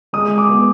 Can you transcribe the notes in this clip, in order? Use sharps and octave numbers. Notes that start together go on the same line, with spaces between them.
G#3 D#6
D6
B3